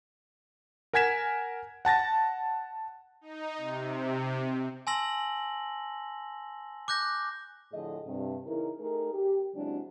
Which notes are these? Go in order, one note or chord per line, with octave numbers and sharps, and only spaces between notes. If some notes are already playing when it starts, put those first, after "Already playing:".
A#4 F#5 G#5 G#6 B6 E7
F#5 A5 A6 A#6
D#4
C3
G#5 A5 C6 E6 A#6 F#7
D6 F#6 G6 A#6
A2 D3 F3 G#4 D#5
G2 C3
C#3 E3 D#4 E4 A#4
A3 D#4 G4 G#4 A#4
G4
C#3 F#3 G#3 C4 D4 E4